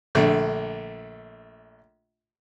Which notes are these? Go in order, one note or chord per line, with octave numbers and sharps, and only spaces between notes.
A#1 D3 A3